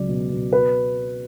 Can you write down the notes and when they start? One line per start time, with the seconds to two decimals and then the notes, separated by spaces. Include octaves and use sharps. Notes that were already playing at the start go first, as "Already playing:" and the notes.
Already playing: C#2 F#3 D5
0.09 B2
0.31 B2
0.53 B4